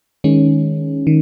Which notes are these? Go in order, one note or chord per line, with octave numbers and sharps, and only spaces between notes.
D#3 G#3 C#4
D#3